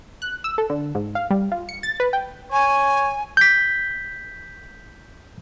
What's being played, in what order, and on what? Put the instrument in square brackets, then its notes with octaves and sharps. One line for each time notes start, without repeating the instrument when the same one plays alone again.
[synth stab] F#6
E6
A4
D3
G#2
F5
G3
F4
C#7
A6
B4
G5
[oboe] C#5 [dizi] G#5
[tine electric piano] G6 B6